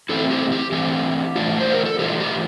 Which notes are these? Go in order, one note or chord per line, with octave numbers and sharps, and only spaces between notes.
E3 A3 C4 E4 A4
G4
G4
E3 A3 C4 E4 G4
E3 A3 D4 F4
C5
A#4
A4
E3 A3 D4 F4 G4
G4